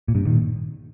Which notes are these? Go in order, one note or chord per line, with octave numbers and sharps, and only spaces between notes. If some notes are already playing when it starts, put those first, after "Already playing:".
A#2
G2 C3
A#2 D#3